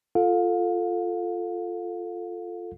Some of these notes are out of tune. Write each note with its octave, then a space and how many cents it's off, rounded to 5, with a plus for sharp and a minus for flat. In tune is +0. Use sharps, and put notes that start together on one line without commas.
F4 +0 A4 +0 F5 +30